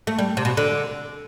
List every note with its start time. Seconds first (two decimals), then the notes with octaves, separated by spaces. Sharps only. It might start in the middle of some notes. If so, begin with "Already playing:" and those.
0.07 A3
0.19 G3
0.37 C3
0.45 B2
0.57 D3